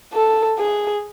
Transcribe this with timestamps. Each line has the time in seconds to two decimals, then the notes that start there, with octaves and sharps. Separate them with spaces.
0.14 A4
0.59 G#4